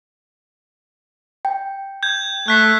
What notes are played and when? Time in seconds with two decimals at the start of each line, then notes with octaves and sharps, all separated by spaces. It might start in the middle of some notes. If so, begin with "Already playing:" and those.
1.45 G5
2.03 G6 G#6
2.48 A3 F#6 B6 C7